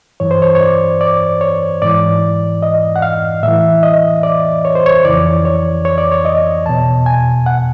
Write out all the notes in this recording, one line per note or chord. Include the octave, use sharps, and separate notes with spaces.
G2 E3 C#5
C5
C#5
C#5
D5
D5
C#5
G#2 E3 D5
D#5
F#5
F5
A2 E3 E5
D#5
D5
C#5
C5
C#5
F2 C#3 E3 D5
C#5
C#5
D5
C#5
D#5
E2 B2 A5
G#5
F#5